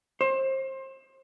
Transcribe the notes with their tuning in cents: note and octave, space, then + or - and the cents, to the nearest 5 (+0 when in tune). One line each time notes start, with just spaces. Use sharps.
C5 +30